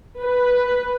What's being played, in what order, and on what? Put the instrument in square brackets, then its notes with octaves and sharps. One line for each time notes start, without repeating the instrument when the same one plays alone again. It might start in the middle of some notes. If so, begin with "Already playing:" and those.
[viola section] B4